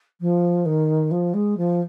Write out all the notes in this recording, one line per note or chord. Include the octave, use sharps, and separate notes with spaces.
F3
D#3
F3
G#3
F3